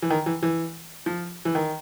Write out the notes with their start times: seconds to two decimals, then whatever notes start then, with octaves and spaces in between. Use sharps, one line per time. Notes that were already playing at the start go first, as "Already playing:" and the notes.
0.02 E3
0.10 D#3
0.26 E3
0.43 E3
1.06 F3
1.45 E3
1.55 D#3